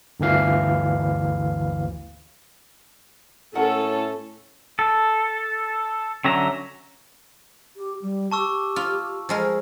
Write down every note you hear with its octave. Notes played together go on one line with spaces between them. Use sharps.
G1 D2 E3 F5
A2 C#4 A4 A#4 F#5 A5
A4
D3 F#3 C#4 E5 A#5
G4
G3
G4 A5 C#6 E6
F4
F3 G#3 A#4